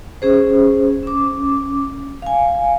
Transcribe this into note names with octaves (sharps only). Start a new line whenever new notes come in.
C#4 G#4 C5
C#4 D6
F5 G#5